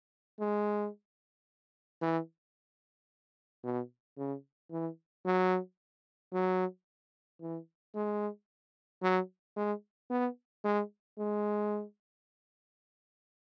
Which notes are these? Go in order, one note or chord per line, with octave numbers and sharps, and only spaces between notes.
G#3
E3
B2
C#3
E3
F#3
F#3
E3
G#3
F#3
G#3
B3
G#3
G#3